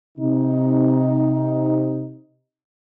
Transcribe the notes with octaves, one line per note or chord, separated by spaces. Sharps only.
C3 D#4